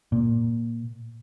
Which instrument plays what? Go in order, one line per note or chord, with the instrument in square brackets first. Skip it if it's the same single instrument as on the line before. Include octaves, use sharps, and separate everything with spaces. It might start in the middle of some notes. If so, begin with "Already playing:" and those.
[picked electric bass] A#2